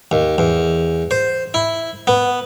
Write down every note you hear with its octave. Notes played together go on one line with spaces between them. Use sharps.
D#2
E2
C5
E4
B3